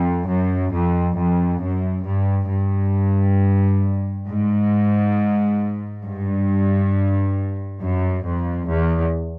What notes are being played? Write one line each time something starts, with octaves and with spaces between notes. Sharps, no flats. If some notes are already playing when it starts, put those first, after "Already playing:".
Already playing: F2
F#2
F2
F2
F#2
G2
G2
G#2
G2
F#2
F2
E2